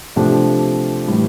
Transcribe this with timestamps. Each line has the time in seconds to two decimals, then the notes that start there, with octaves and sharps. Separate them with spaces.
0.16 C3 F3 A3 D4 G4
1.07 A2 E3 G3